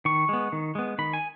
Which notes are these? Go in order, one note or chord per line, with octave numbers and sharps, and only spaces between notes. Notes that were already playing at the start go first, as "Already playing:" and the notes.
D#3 C#6
G#3 B3
D#3
G#3 B3
D#3 B5
G#5